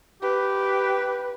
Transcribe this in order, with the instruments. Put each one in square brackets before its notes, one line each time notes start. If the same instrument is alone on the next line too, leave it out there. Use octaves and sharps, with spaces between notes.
[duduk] G4 [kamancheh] B4